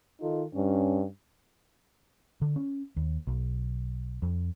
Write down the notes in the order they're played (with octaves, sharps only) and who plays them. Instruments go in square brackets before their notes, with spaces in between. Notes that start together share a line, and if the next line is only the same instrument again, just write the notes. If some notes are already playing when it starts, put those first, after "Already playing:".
[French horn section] D#3 D#4 F4 A4
G2 C#4
[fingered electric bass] D3
C#4
D#2
B1
F2